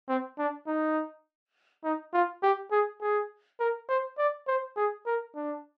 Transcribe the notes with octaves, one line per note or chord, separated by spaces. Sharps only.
C4
D4
D#4
D#4
F4
G4
G#4
G#4
A#4
C5
D5
C5
G#4
A#4
D4